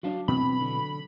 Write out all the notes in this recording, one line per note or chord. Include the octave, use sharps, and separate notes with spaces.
F#3 D4 F#4 D5 F5 A5
B2 E3 B3 C4 B5
D3